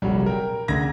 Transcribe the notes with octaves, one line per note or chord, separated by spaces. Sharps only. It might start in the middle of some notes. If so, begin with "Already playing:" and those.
F1 A#1 F#3 G3
A#4 G5
D2 C#3 A#5 G#6 A#6